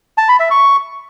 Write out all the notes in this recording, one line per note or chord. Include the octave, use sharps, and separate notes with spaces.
A5
B5
E5
C#6